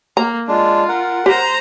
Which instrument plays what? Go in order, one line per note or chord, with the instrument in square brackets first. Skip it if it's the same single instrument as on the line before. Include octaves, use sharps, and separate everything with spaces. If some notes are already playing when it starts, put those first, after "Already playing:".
[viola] A#3 [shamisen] A#5
[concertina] G#3 D4 [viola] F4
[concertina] A#4 F#5
[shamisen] G4 [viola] C5 A#5